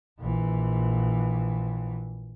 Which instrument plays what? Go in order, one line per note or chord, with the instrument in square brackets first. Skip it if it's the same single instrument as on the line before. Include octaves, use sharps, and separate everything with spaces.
[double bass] A#1 E3